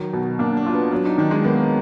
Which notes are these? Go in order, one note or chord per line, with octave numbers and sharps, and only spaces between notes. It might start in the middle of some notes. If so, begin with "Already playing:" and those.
Already playing: D#3 F#3
B2
A#3 D4
D4
F4
B3
F#3 D4
D#4
D#3 D4
G#3
A#3 B3